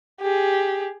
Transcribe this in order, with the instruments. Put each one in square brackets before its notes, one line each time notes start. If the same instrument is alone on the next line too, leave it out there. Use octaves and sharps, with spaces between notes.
[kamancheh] G4 G#4